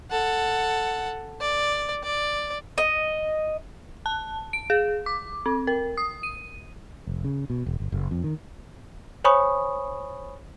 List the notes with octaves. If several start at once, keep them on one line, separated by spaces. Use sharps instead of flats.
A4 F#5
D5
D5
D#5
A5
D7
G#4
D6
C4
A#4
D#6
D#7
F1
C#3
B2
E1
G1
F#1
F2
D#3
C5 C#5 G#5 B5 C#6 D#6